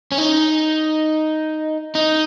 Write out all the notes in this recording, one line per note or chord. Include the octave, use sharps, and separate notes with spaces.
C#4
D#4
D#4